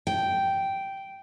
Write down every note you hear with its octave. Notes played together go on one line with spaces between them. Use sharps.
G5